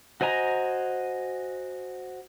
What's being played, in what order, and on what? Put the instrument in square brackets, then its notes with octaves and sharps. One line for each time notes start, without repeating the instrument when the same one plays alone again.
[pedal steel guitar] F#4 C5 D#5 G#5 A#5